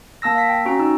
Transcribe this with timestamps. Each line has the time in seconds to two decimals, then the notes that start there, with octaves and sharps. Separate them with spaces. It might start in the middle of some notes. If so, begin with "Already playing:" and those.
0.22 A#3 A5 E6 A#6
0.35 F5 B6
0.49 G5
0.65 C#4 F#4 A#5 D7
0.79 D#4 E6